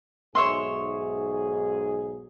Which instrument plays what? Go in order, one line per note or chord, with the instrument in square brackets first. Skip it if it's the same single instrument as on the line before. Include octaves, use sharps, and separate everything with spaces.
[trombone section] B1 G#2 G#4 [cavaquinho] C#5 E5 C6